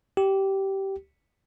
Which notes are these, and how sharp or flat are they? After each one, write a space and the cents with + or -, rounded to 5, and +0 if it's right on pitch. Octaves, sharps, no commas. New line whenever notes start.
G4 -15